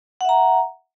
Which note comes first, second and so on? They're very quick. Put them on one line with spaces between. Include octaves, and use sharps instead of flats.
F#5 E5 A#5